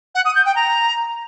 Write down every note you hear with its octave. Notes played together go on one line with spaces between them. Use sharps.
F#5
D#6
G6
G5
A#5